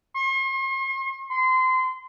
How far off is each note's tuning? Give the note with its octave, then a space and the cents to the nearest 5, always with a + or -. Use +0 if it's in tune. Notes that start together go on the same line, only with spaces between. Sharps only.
C6 +45
C6 -25